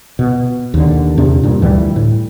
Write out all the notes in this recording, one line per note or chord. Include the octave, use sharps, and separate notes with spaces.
B2
D#2 D3
E2 C3 D4
G2 A#2
D2 E3 G3
A2